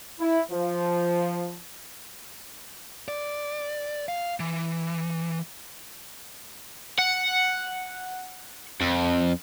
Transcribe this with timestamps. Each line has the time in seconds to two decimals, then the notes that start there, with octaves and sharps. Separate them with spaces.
0.20 E4
0.51 F3
3.08 D5
4.08 F5
4.40 E3
6.99 F#5
8.81 F2